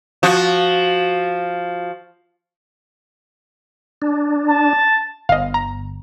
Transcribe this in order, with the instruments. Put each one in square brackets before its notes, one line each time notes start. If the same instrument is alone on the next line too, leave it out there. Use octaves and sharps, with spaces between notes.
[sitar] F3 F#4
[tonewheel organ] D4
[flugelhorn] A5
[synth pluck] G1 [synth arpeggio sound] D#5 F5
[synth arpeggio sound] A#5